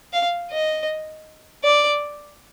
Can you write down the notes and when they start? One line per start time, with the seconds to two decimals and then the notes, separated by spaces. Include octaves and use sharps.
0.13 F5
0.51 D#5
1.64 D5